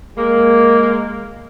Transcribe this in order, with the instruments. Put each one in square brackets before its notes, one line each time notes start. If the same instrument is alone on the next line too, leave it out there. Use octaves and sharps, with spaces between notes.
[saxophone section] G#3 A#3